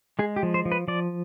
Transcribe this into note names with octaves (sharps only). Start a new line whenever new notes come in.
G#3 G#4
G4
F3
C5
F3
B4
F3 D5